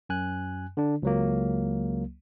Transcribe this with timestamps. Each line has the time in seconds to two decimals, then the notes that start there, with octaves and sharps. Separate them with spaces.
0.09 F#2 G#5 F#6
0.77 D3 D4
1.03 C#2 F#3 A#3